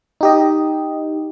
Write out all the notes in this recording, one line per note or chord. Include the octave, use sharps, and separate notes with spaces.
D#4 G4 D#5